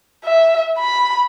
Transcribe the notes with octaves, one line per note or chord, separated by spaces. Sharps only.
E5
B5